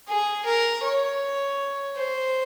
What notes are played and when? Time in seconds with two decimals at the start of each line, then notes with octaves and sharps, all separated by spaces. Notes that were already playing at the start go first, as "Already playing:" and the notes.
0.08 G#4
0.45 A#4
0.83 C#5
1.96 C5